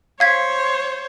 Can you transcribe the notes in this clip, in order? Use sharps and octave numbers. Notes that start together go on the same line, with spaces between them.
C5 C#5 F5 G#6 B6